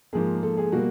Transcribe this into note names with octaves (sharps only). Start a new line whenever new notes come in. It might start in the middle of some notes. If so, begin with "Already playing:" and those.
G#2 F3 A#3 G#4
A4
G#4
B2 G3 A#3 F#4